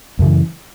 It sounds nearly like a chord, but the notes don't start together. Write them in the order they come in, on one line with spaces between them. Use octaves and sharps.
F#2 C#3 E3